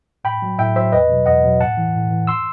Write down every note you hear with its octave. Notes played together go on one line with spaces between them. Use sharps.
A2 G5 B5
F#3
A2 E5 G5
F#3 C5 E5
E2 B4 D#5
B2 F#3
E2 D#5 F#5
B2 F#3
A2 F#5 A5
E3
A2
E3
C6 E6